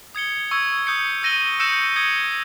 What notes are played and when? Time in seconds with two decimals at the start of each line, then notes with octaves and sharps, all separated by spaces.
0.15 D#6 G#6 C#7 G7
0.51 C#6 E6 G#6
0.87 D#6 G6 C#7
1.23 E6 A#6 D#7 G7
1.60 E6 G6 A#6 C#7 E7
1.96 D#6 G#6 C#7 G7